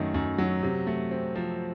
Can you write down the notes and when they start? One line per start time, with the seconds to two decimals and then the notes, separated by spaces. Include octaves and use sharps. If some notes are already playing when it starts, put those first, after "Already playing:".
Already playing: F#2 D#3 F#3 A3
0.14 F#2
0.38 F#3
0.63 C3
0.87 A3
1.11 C4
1.35 F3